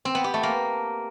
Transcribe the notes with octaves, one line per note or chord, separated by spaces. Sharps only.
C4
B3
G4
A3
A#3